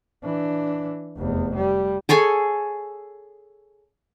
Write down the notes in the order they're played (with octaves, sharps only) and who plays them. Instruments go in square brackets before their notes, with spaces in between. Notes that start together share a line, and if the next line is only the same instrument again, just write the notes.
[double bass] E3 D4
F1 E2
G3
[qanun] G#4 A4 C#5 G#5